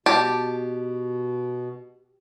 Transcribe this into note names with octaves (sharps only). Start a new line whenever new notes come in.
B2 G4 A5